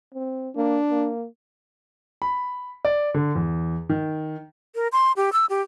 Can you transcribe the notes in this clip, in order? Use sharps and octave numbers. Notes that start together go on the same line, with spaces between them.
C4
A#3 D4
A#3
B5
D5
D3
E2
D#3
A#4
C6
G4
E6
G4